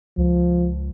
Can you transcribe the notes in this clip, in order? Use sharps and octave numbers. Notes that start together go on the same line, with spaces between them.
C#2 F3